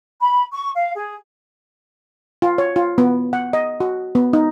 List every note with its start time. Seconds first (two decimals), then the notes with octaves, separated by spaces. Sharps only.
0.19 B5
0.52 C#6
0.76 F5
0.95 G#4
2.42 F4
2.58 C#5
2.76 F4
2.98 B3
3.33 F#5
3.53 D#5
3.80 F#4
4.15 B3
4.33 D#4